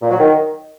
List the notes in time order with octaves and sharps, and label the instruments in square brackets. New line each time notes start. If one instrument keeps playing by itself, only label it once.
[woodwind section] A#2
F#3
D#3